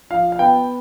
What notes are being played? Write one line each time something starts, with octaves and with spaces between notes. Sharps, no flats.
F3 F5
F5
B3 G5